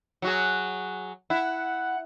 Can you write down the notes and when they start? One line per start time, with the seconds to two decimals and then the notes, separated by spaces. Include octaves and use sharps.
0.22 F#3 F#4 G#4
1.30 E4 F#5